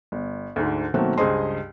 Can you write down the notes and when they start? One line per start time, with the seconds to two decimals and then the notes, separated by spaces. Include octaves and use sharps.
0.12 G1
0.56 D2 G#2 D3
0.94 B2 D#3 F#3 A3 A#3 C4
1.18 C#2 G2 G#4 C5 D#5 C6